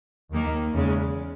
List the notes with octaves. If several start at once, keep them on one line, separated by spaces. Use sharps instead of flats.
D#2 D#3 A#3
E2 C#3 G#3